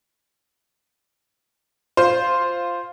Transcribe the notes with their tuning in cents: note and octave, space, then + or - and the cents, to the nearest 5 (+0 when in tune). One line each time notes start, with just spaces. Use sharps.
F4 +0 C5 +0